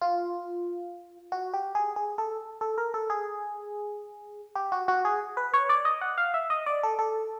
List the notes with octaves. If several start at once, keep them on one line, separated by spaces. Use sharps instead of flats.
F4
F#4
G4
G#4
G#4
A4
A4
A#4
A4
G#4
G4
F#4
F#4
G#4
B4
C#5
D5
D#5
F#5
F5
E5
D#5
D5
A4
A4